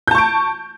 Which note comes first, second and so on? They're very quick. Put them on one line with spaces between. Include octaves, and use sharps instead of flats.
G6 A5 C#6 D7